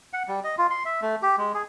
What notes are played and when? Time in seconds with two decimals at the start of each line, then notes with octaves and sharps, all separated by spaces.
0.13 F#5
0.28 G3
0.44 D#5
0.58 F4
0.70 C6
0.85 E5
1.01 A3
1.22 G4
1.38 G#3
1.54 G#4